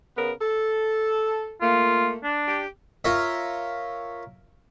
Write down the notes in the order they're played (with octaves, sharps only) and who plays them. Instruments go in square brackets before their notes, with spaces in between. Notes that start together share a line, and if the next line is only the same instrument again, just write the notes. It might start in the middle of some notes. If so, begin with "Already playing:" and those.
[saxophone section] C#3 B3 A#4
A4
[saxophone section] A3 A#3 [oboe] F4
[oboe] D4
[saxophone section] G4
[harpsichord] F4 A#4 C#5 E5